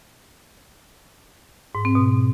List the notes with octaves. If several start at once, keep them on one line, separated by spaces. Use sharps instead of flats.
G#2
C4
B2